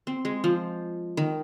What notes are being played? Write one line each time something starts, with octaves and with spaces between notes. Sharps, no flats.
C4
G#3
F3
D#3